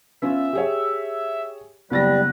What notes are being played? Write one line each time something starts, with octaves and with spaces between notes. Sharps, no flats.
B3 C#4 F4 E5
G4 G#4 C#5
F#1 G3 B3 B4 A6 A#6